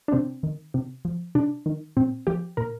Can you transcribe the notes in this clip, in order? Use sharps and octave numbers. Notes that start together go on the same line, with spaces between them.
D4
C3 C4
D#3
C3
F3
C3 D4
D#3
A#2 C4
F3 G4
A#2 A#4